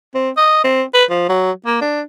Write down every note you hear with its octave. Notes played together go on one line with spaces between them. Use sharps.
C4
D#5
C4
B4
F3
F#3
A#3
D4